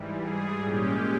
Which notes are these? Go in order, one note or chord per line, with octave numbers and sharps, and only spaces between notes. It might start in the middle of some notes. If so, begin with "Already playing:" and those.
Already playing: G#2 E3 G3
G#4
A#2 G#3 C#4 G4